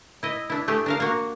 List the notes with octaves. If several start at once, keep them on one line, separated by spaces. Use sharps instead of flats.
E4 D#5
D4 E4
A3 G4 G#4
D4 A#4 F5
A#3 F#4